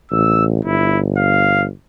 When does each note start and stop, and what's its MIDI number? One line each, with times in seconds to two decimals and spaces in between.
0.11 0.63 33
0.11 0.44 88
0.65 1.68 31
0.65 0.99 64
1.17 1.65 77